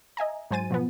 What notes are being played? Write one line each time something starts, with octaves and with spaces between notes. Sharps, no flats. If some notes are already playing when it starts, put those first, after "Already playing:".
D#5 E5 G#5 A#5
G#2 F#3 C5 G#5 A6 D#7
B2 F3 B3